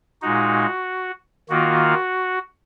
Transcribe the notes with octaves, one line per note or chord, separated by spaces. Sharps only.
A#2 G#3 D#4 F#4
D#3 A#3 F4 F#4